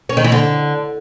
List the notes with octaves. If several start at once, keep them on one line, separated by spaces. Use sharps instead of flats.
C#4
D#3
E3
D3